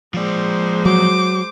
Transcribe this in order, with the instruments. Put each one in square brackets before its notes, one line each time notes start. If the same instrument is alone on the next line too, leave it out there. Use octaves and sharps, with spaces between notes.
[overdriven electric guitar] F3 D5 [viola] G#3 C5
[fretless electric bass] F#3 [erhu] D6